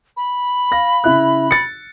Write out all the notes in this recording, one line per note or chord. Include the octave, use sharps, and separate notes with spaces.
B5
F5 A#6
C#3 E4 F#6
A6 C#7